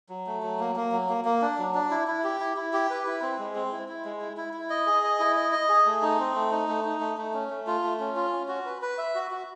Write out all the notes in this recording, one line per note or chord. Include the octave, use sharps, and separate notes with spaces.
F#3
A3
F#3
A#3
A#3
F#3
A#3
A#3
D4
F#3
D4
E4
E4
G4
E4
E4
G4
B4
E4
C4
G#3
C4
E4
E4
G#3
E4
E4
E4
D#5
G#4
D#5
E4
D#5
D#5
G#4
A3
D#4
C4
A3
D#4
A3
D#4
A3
A3
C#4
A3
F4
A3
C#4
F4
C#4
F#4
B4
B4
E5
F#4
F#4